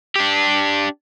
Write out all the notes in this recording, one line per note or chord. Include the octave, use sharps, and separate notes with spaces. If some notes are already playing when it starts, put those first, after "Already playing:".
D4 G4